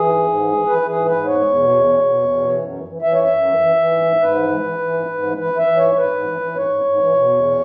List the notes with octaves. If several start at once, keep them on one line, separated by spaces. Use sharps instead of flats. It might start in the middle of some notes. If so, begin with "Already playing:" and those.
Already playing: E3 G#4
G#2
G#2
E3
E3
E3 B4
E3 G#4
G#2
B4
G#2
E2 C#5
E2
B2
E2
B2
B2
E2
B2
E3
F#2
E3
E3
E3 E5
F#2 C#5
E5
F#2
E3
E3
E3
G#2
G#2
G#2 B4
E3
E3
E3
E3
G#2
G#2
E3
E3 B4
E3 E5
E3
G#2 C#5
G#2 B4
G#2
E3
E3
G#2 C#5
G#2
G#2
E3
B2
E2
B2